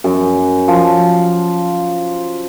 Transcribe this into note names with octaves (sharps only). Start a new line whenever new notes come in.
F#2
F3